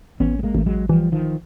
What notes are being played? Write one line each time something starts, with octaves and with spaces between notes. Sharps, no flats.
A1 B3 C#4
A3
G#3 A#3
A1 A3
F#3 G#3
E3 F3 G3
D#3 F3